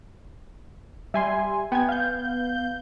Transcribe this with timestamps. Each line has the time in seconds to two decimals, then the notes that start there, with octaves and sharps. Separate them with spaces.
1.14 G3 E5 G#5 C6
1.72 B3 G5 G#5 G#6
1.89 F5 G6